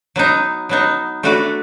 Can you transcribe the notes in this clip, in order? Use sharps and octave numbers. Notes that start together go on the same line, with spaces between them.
F#3 B3 D#4
F#3 B3 D#4
A3 D4 F#4 B4 D5